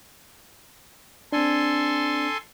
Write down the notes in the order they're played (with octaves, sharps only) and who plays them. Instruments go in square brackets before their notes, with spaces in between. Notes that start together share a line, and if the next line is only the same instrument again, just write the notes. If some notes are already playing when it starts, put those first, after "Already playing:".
[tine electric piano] C4 D4 [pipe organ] A4 G#5 C6